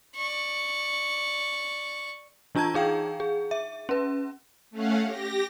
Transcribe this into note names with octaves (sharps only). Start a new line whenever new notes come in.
D5 C#6
E3 D4 F4 A5 A#5 G#6
D#4 G#4 F5 G5
G#4
E5
C#4 B4
A3 C#4 F5 F#5
G4 A#6